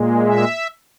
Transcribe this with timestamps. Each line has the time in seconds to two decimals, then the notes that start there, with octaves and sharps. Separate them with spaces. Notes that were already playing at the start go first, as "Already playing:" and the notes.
Already playing: A#2 G#3
0.26 E5